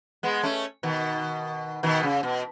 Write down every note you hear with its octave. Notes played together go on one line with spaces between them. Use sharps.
G#3 B3
A3 C#4
B2 D#3
B2 D#3
C#3
B2